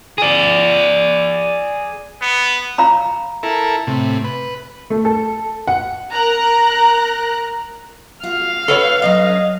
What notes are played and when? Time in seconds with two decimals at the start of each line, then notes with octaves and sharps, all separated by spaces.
0.18 G#4 D5
2.21 B3
2.78 F5 A#5 B5
3.43 E4 A4 A#4
3.87 A2 C3
4.24 B4
4.90 A3
5.05 A4
5.67 F#5
6.12 A#4 A#5 F#6
8.23 F4 F#4 F5
8.68 A4 B4 C#5 F#5
9.02 F#3 C#4 D#5 E5